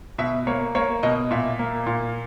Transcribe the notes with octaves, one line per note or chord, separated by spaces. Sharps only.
B2 E5
A#3 C#5
A#3 C#5
B2 D#5
A#2 E5
A#3
A#2